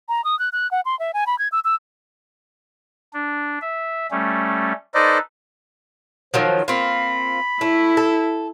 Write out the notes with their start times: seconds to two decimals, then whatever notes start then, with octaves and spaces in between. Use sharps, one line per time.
0.09 A#5
0.24 D#6
0.39 F#6
0.53 F#6
0.71 F#5
0.85 C6
0.99 E5
1.14 G#5
1.27 B5
1.39 G#6
1.52 E6
1.65 E6
3.13 D4
3.61 E5
4.11 G3 A3 C#4
4.95 D#4 A4 B4 C5 D5 D#5
6.34 D#3 F3 F#3 C5
6.68 A#3 C4 F4 B5
7.61 A3 E4
7.97 A4